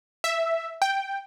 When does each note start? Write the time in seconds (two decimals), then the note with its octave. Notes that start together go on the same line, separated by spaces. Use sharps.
0.24 E5
0.82 G5